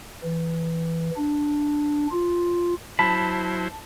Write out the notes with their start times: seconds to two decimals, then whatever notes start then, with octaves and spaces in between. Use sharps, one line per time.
0.24 E3
1.17 D4
2.11 F4
2.99 F#3 E4 C5 A5 B5